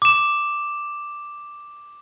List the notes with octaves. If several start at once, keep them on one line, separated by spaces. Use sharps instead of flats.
D6 E7